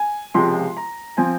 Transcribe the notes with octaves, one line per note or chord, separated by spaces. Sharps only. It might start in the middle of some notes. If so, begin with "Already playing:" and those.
Already playing: G#5
C#2 C3 F3 G#3 C6
A#5
F3 C4 G#5